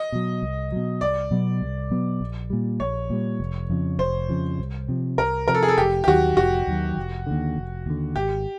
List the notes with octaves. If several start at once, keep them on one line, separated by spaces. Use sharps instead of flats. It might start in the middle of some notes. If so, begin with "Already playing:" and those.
Already playing: D#5
B2 F#3
C2
B2 F#3
C2 D5
B2 F#3 B3
C2
B2 F#3 B3
A#1
A#2 G3
A#1 C#5
A#2 G3
F1
F2 C#3 F3
F1 C5
F2 C#3 F3
C2
C3 F3
C2 A#4
C3 F3 A#4
A4
G#4
A4
F1 G4
G4
D#2 D#3 F#3 F#4
F1 F#4
D#2 D#3 F#3
F1
D#2 D3
F1
D#2 D3
G#1 G4